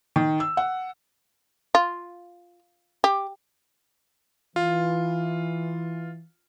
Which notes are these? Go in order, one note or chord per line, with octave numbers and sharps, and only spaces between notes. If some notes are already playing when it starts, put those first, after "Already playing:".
D#3
E6
F#5
F4
G4
E3 F4